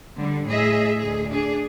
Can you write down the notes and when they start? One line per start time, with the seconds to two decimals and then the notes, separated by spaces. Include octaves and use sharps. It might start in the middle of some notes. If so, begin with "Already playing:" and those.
0.17 D3 G3
0.47 A2 G#4 D#5 E5
1.00 D2 G#4
1.29 D4 G#4